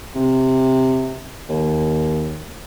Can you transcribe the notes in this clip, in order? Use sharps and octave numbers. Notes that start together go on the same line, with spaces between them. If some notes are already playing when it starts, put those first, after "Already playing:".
C3
D#2